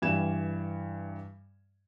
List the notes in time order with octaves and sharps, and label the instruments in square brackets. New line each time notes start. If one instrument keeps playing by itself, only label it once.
[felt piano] G2 E3 G3 G#6 E7